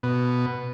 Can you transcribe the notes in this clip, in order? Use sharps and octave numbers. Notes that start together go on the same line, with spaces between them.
B2